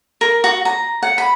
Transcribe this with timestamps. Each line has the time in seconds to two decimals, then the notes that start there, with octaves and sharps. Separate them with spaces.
0.21 A#4
0.44 F#4
0.65 A#5
1.02 F#5
1.18 B5